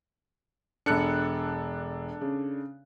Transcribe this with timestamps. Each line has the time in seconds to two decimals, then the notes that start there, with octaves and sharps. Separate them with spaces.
0.86 E1 D4 A4 F#6 C#7
2.21 C#3